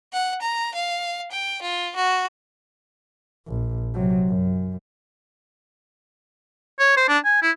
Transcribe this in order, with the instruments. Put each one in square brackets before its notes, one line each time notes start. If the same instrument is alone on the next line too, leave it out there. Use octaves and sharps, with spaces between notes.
[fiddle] F#5
A#5
F5
G5
F4
F#4
[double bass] A#1
C3 F#3
F#2
[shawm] C#5
C5
D4
G#5
E4